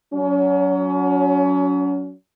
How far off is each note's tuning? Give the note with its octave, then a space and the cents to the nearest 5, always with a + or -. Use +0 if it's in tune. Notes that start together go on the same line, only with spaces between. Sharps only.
F#3 +0 C#4 +35